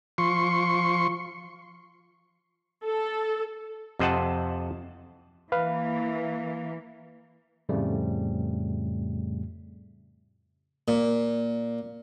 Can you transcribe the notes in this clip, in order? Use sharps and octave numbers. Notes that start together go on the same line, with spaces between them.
F3 C6 C#6
A4
F2 C3 C5 D#5 F#5 A5
E3 A#3 B4 F5
F2 A2 C#3 G3 A3
A#2